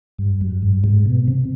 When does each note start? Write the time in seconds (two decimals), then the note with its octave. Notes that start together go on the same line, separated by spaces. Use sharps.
0.18 G2
0.41 F#2
0.62 G2
0.84 G#2
1.06 B2
1.28 C3